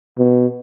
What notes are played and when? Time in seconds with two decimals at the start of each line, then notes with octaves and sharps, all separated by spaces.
0.18 B2